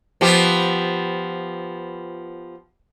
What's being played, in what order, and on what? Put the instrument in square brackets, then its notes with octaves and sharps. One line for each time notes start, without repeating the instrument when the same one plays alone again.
[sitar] F3 B3 G4